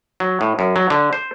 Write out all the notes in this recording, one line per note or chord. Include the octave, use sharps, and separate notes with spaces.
F#3
A2
F#2
F#3
D3
C5